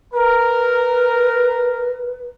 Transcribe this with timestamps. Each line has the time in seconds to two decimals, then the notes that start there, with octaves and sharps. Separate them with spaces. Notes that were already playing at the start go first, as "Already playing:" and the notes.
0.13 A#4 B4